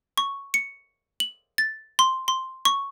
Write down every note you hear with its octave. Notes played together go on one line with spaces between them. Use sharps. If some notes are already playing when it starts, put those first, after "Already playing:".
C#6
C#7
F#7
A6
C6
C6
C#6